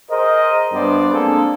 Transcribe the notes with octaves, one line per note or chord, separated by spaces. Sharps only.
G#4 A#4 C5 D#5
G2 G3 B3 D4 C5 D5
G#3 A#3 C4 D4 G#4 A4